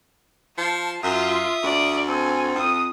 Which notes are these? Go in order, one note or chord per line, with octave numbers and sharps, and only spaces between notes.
F3 A5
F#2 F4 E5 D#6
D2 D5
C4 A4 G#5
F2 D#6